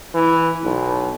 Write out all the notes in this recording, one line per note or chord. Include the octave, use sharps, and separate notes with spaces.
E3
B1